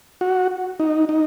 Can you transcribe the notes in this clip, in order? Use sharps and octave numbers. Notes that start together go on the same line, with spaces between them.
F#4
D#4
D#4